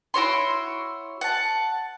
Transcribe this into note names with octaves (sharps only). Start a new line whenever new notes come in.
E4 F#4 C#5 C6
F#5 A5